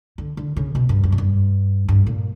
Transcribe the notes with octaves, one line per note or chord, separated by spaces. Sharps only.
D3
D3
C#3
B2
G2
F#2
A#2
G2
G2
A#2